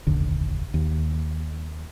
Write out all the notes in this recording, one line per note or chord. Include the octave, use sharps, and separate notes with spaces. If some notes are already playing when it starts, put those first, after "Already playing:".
F1 A#1 D#2 D3
D#2